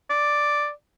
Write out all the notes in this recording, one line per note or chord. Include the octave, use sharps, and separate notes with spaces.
D5